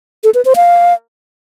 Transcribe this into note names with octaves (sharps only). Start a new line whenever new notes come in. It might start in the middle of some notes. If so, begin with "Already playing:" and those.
A4
B4
C5
F5